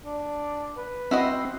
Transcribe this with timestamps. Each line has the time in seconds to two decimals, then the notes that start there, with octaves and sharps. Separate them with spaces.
0.04 D4
0.77 B4
1.11 C4 E4 F#4 D#5